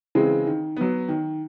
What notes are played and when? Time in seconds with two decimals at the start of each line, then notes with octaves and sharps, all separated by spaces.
0.15 C#3 E3 G#3 C4
0.47 D#3
0.77 F#3 B3
1.08 D#3